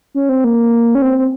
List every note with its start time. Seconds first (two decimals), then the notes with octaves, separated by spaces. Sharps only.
0.15 C#4
0.29 C4
0.44 A#3
0.95 C#4
1.02 C4
1.19 C4